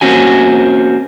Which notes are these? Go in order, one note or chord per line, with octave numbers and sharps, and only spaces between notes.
A#3 C4 C#4 F#4 G#5